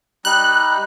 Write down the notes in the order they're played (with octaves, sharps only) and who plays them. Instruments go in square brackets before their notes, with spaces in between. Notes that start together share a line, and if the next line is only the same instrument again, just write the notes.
[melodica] G3 D#4 [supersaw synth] F#6